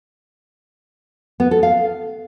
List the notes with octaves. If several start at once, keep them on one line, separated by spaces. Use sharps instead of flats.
B3
A4
F5